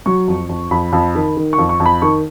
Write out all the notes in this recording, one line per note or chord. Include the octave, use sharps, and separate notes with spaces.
F#3 C#6
F2
F2
F2 B5
F2
D#3
D#3
C#6
F2
C#6
F2
B5
D#3 C#6